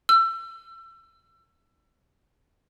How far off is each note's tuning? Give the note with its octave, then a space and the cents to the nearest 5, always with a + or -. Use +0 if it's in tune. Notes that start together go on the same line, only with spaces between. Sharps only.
E6 +30